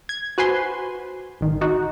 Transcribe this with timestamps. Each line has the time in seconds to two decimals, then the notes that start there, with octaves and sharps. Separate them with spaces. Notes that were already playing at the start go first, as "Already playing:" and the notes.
0.09 G#6
0.38 F#4 B4 C5 G#5 C6
1.41 A1 D#3
1.61 D#4 F#4